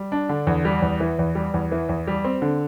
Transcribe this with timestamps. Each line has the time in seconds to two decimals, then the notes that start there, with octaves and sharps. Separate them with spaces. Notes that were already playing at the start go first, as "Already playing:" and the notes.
Already playing: G3
0.12 D4
0.29 D3
0.47 E2
0.65 G3
0.82 E2
1.00 E3
1.19 E2
1.35 G3
1.54 E2
1.71 E3
1.89 E2
2.07 G3
2.24 C4
2.42 D3